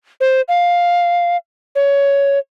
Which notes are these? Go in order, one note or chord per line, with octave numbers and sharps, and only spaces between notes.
C5
F5
C#5